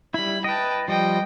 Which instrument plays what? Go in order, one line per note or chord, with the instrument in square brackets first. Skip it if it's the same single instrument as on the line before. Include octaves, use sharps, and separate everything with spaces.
[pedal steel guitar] G3 E4 [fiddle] B5
[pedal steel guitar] B4 D#5 [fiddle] G5 A5
[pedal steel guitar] F3 G3 [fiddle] D#5 G5